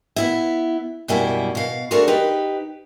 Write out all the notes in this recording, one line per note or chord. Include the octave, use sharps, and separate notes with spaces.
B3 E4 E5
F#2 B2 G3 A#3 E4 G#5
B2 F5
A3 D4 F#4 G#4 A#4 C5
D#4 G4 B4